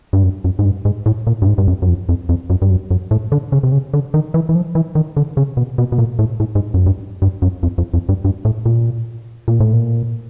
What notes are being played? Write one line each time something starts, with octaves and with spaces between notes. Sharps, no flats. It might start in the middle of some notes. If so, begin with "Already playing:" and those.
G2
F#2
F#2
G#2
G2
G#2
A2
A#2
G2
G#2
G2
F#2
F#2
F2
F2
F2
F#2
G2
F#2
F#2
A2
D3
C#3
C3
C#3
D3
D#3
E3
E3
F3
E3
D#3
D3
C#3
B2
B2
B2
A#2
A2
A2
G#2
F#2
G2
G2
F#2
F2
F2
F2
G2
G2
A2
A#2
A#2
A2
A#2